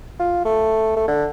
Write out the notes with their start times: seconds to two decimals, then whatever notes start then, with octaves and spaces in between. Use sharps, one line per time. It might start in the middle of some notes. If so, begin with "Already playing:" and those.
0.19 F4
0.45 A3
0.96 A3
1.08 D3